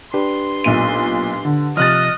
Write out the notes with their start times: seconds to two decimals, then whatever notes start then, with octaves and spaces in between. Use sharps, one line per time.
0.14 D4 G4 B4 C6
0.64 B1 A#2 D#7
1.45 D3
1.77 C3 F3 D#5 F6 F#6 A6